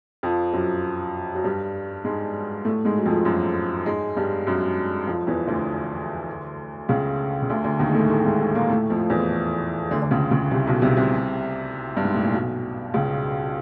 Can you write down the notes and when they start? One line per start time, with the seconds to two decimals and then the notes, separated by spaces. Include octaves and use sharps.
0.23 F2 F3
0.53 F#2 F#3
1.35 F#3
1.44 G2 G3
2.04 G#2 G#3
2.65 A2 A3
2.85 G#2 G#3
2.99 F#3
3.06 F2 F3
3.25 F#2 F#3
3.86 G#2 G#3
4.17 G2 G3
4.47 F#2 F#3
5.07 F2 F3
5.27 E2 E3
5.47 D2 D3
6.89 C#2 C#3
7.42 C#3
7.50 D2 D3
7.64 D2 D3
7.79 D#2 D#3
7.89 G#3
7.94 A2 A3
8.09 A2 A3
8.25 G#2 G#3
8.40 A2 A3
8.55 A#2 A#3
8.70 A2 A3
8.90 F2 F3
9.10 E2 E3
9.91 D2 D3
10.02 D3
10.11 C#2 C#3
10.31 C#2 C#3
10.51 C2 C3
10.67 B1 B2
10.82 C2 C3
10.97 C2 C3
11.97 G2
12.05 G#2
12.14 A2
12.24 A#2
12.33 B1 B2
12.94 C#2 C#3